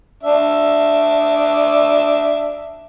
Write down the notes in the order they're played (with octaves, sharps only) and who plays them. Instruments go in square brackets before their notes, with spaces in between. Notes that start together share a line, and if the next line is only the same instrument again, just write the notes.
[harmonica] D4 E5